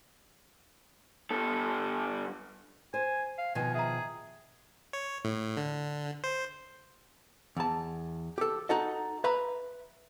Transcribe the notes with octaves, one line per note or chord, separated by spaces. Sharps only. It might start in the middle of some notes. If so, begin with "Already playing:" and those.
G2 A4
C5 G#5
F5
B2 D#3 F3 G#5
G#4 E5 A#5
C#5
A2
D3
C5
E2 A5
G4 A4
D#4 F#4 A4 D#5
B4 E5 A#5 B5